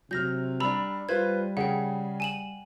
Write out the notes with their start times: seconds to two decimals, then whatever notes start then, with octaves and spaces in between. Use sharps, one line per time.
0.11 C3 F#3 F6 G6 A#6
0.60 G3 D4 A#5 B5 E6
1.09 G3 F4 B4 C5 G#6
1.57 C#3 G#4 F#5 G5
2.20 G#5 E7 F#7